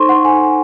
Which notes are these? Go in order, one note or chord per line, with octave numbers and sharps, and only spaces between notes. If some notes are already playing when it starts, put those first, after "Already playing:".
Already playing: D#4 A4 C5 C6 C#6
F#5
G#5